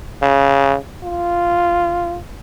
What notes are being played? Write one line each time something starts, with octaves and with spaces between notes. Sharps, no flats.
C#3
F4